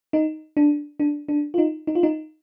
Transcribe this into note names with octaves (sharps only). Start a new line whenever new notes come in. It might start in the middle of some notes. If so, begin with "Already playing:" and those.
D#4
D4
D4
D4
F4
D#4
D#4
F4
D#4